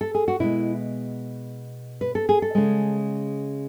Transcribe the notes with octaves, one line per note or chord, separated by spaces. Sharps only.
A4
G#4
F#4
B2 G#3 E4
B4
A4
G#4
A4
C#3 G#3